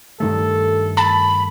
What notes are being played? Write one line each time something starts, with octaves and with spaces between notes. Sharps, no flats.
G2 D#3 A3 A4
A5 B5